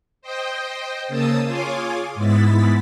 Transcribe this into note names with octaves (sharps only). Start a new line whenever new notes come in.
C5 D#5 G5
C#3 A#3 A5 D#6 E6
F4 G#4 C#5 G#5 C6 D6
G#2 G#3 B3 E4 A6 B6